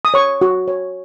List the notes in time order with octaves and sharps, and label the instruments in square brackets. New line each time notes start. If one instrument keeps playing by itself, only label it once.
[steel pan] D#6
C#5 C#6
F#4
C#5